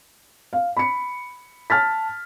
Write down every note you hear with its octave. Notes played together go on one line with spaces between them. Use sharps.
F5
B5 C#7
A5 F6 A6 B6